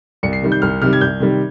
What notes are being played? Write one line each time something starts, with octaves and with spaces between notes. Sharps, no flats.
C2 C#7
C7
C3 D#3 G3
G6
C2 F6
C3 D#3 G3 F6
G#6
C2 G6
C3 D#3 G3